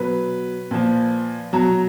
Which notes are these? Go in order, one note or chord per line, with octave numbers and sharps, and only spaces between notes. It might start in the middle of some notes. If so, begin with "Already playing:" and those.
Already playing: B2 F#3 B4
A#2 F3
B2 F#3 A#5